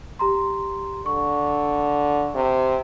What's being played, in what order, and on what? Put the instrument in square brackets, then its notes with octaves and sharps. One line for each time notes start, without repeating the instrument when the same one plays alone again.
[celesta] G4 A#5 C6
[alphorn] D3 [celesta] C#6
[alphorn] C3